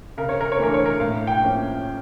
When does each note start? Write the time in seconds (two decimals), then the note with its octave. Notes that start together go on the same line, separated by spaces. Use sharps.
0.17 C#3 A#4
0.29 C#5
0.41 A#4
0.52 C#5
0.59 E3 A3 D4 A#4
0.74 C#5
0.86 A#4
1.00 A2 F5
1.27 G5
1.42 F3 A#3 C#4